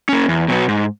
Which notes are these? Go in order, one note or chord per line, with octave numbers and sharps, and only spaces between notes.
A#3 C#4
E2
B2 F#3 B3
G#2